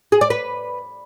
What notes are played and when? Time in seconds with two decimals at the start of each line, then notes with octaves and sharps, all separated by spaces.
0.12 G#4
0.21 D5
0.30 B4